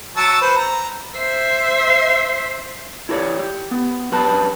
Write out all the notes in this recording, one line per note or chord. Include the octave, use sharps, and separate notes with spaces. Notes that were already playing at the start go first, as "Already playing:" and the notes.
F#3 A5 E6
B4 C5
A#5
C5 E5
E4 G4 A#4 C#5 D5
G4
B3
F#2 G4 B4 A5